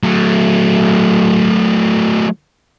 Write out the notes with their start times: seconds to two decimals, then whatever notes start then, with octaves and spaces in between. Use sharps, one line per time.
0.04 F#3 A3